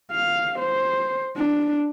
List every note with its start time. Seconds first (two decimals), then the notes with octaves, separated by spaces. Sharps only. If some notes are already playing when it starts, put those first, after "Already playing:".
0.12 F5
0.59 C5
1.37 D4